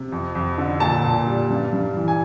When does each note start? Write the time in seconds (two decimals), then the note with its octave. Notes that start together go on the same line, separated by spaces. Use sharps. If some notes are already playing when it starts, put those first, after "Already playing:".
Already playing: C3
0.12 F2
0.35 F2
0.58 D3
0.80 A#2 A5
1.03 A#2
1.26 G3
1.50 G2
1.73 G2
1.96 E3
2.08 G#5